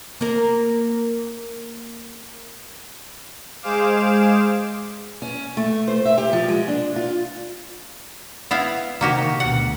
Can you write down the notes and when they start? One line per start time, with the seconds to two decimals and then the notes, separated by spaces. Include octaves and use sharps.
0.21 A#3 A#4
3.62 G#3 G#4 C5 F5 D6 E7
5.22 C#4
5.57 A3
5.88 C5
6.05 E5
6.18 G4
6.33 F3
6.48 G#3
6.68 D4
6.96 F4
8.51 B3 E4 F5
9.01 C3 D#3 A#3 F#4 G4
9.40 D2 B2 F#5